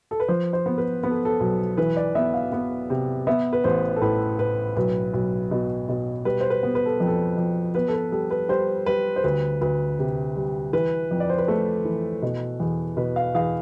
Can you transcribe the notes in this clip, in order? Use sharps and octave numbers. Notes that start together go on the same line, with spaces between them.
A4
B4
F3 C5
C5
B3
B4
B3 B4
A4
A4
B1
E3 B4
D5
B3 E5
F5
B3
C3
B3 E5
B4
A1 C5
A4
A2 B4
A2 B4
B1 B4
B1
B2
B2
G3 B4
C5
B4
B3
B4
A4
F2
A4
F2
B3 B4
A4
B4
G3 A4
B4
G3 C5
G3 B4
C5
D2 B4
D2 B4
C3
G3
E3 B4
F2
D5
C5
B4
A3 A4
E3
B2
E2
B2 B4
F5
E2 F5